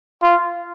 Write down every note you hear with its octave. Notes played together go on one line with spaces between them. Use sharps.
F4